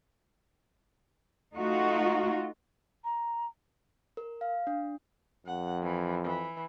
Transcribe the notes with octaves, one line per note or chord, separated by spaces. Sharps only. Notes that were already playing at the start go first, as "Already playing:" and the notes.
A3 D#4 F4 F#4
A#5
A#4
F5
D4
F2 F#5
E3
E3